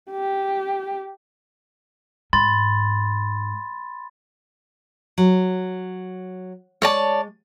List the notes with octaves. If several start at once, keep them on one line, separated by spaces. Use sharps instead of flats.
G4
G#2 B5 C6 A6
F#3
G#3 C#5 D5 A5